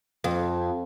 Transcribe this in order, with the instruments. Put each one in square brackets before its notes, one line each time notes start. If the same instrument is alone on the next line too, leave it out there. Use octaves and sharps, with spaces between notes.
[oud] F2